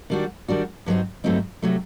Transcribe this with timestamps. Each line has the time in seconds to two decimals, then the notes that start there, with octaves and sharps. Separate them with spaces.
0.10 D#3 G3 D4 F#4
0.48 D#3 G3 D4 F#4
0.86 G2 F#3 A3 C4 D#4
1.24 G2 F#3 A3 C4 D#4
1.62 C3 F#3 A3